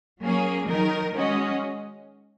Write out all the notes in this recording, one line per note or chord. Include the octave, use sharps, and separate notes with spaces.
F#3 A#3 C#4 G#4
D#3 F#3 D#4 A#4
G#3 C#4 F#4 D#5